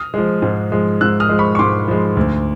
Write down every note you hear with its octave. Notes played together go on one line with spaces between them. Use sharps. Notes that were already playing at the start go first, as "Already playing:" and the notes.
Already playing: D#6 F6
F3 G#3
G#2
F3 G#3
G#2 E6 F#6
D#6 F6
F3 G#3
B5 C#6
C#6
G#2 C6 D6
F3 G#3
D2